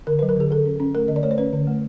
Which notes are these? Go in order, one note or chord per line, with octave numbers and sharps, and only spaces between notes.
D3 A#4
B4
F#3
A#4
D3 G#4
D3 A4
C#4
C#4
A3 A#4
D3 D#5
D5
A3 C#5
C5
C#4 B4
D3
A3